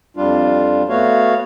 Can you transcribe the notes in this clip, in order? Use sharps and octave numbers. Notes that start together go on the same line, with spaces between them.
F2 G3 D4 F4
A3 B3 F#4 C#5 F5